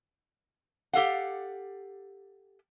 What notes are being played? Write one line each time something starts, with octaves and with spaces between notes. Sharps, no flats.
G4 A4 F5 F#5